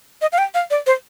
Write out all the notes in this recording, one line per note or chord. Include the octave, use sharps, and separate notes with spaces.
D#5
F5
G5
F5
D5
C5